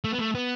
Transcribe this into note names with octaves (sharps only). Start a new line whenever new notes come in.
A3
B3
A3
B3